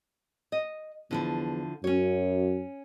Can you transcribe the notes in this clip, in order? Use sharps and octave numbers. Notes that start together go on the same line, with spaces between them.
D#5
E2 D3 F3 E4
F#2 F#3 C#4 C#5